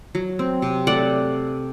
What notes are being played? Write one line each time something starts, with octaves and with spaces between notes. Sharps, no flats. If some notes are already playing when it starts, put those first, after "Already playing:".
F#3
C4
C3
A3 D5 F#5